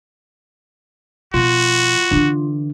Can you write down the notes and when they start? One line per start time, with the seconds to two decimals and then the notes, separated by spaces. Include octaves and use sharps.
1.34 B2 F3 F4 F#4
2.11 D3 E3 D4